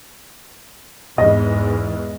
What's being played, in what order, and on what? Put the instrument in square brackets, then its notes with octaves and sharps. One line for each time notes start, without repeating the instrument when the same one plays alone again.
[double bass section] E2 G#2 E3 [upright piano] D#5